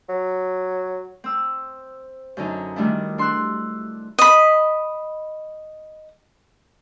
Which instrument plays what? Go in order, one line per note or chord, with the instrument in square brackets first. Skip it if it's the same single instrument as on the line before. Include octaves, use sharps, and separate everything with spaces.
[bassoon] F#3
[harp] C4 E6
F#2 D3 D#4
D#3 G3 A3 D4 E4
D4 C6 E6 F#6
[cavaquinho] D#5 B5